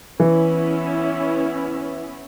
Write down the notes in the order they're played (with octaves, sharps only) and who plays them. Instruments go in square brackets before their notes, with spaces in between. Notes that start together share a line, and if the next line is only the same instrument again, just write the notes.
[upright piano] E3 [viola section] B3 C#4 E4